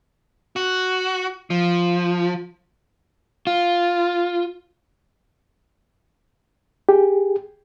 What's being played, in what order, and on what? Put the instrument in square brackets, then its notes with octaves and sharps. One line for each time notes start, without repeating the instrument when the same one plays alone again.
[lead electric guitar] F#4
F3
[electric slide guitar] F4
[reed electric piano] G4 G#4